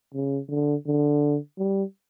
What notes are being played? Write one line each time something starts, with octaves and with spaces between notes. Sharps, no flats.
C#3
D3
D3
G3